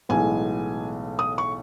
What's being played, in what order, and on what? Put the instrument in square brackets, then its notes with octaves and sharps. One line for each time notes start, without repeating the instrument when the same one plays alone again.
[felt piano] B1 A2 E3 G#3 B3 G#5
D#6
C#6